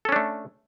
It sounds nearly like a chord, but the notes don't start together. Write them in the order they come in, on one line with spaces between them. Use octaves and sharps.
A4 C#4 D4 A3